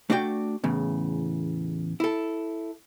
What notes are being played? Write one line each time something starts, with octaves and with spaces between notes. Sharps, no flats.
A3 D4 F#4 D5 G5
E2 A2 C#3
E4 A4